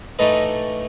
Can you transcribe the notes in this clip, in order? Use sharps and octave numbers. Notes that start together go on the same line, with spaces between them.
A2 E3 A3 D#4 B4 D#5